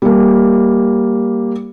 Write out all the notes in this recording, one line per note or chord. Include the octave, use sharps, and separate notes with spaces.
G3 A#3